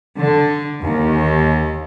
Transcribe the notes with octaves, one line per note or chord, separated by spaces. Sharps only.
D3
D#2